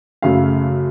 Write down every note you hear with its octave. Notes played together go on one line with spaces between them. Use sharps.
F#2 C#3 A3 F5